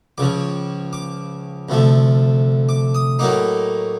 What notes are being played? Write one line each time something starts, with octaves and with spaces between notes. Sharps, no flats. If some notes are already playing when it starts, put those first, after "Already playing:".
C#2 C#3 F3 D6
D6
D2 C3 F3 A3
D6
D#6
A2 F#3 A#3 D#4 D6